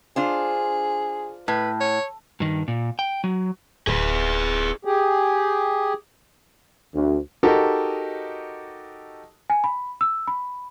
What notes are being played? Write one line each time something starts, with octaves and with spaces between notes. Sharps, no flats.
D4 F4 G#4 C5
A2 B4
C#5
G2 D#3
A#2
G5
F#3
D1 G#4 B4
G4 G#4
D2
D#4 F#4 G4 A4 A#4
G#5
B5
E6
B5